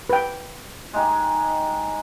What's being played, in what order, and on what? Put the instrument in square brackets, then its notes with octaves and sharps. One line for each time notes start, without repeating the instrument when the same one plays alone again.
[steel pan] B4 G5
[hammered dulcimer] G#3 D#4 G4